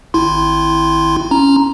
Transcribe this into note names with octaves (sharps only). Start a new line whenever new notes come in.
G#1 E4 C6
C#4 A#5